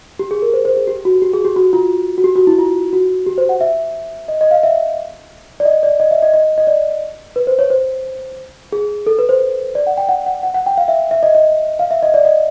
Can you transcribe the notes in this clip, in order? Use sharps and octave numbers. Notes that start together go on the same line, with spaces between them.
G4
G#4
A#4
C5
C5
G#4
G4
F#4
G4
G#4
G4
F#4
F4
F#4
G4
F#4
E4
F4
F#4
G4
C5
F#5
E5
D#5
D#5
F5
E5
D5
D#5
D5
D#5
E5
D#5
D#5
D#5
D5
B4
C5
C#5
C5
G#4
A4
B4
C5
D5
F#5
G5
F#5
F#5
F#5
F#5
G5
F5
E5
E5
D#5
D#5
F5
E5
D#5
D5
D#5